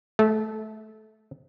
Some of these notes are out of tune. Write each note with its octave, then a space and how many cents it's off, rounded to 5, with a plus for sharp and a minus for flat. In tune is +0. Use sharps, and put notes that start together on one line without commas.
A3 -20